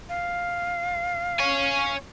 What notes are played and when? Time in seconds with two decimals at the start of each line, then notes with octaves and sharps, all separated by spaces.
0.09 F5
1.39 C#5 G#5